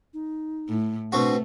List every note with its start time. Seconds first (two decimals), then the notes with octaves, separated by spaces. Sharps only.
0.14 D#4
0.69 A2
1.12 B2 A3 C4 D4 F#4